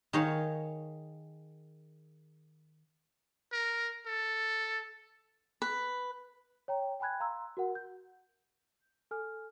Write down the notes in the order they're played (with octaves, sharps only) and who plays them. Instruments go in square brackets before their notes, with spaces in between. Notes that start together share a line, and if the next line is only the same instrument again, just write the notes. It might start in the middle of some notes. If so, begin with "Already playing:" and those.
[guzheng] D#3 G#4 C#5 F5
[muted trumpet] A#4
A4
[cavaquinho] B4
[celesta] C#5 G5 A#5
G5 G#5 B5 F#6 G#6
F5 A#5 C6 E6
F#4 A#4 F#5
G6
A4 G#5 F6